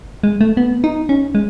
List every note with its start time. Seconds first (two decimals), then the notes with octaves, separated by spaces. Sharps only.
0.23 G#3
0.41 A3
0.57 B3
0.84 D#4
1.09 C#4
1.35 G#3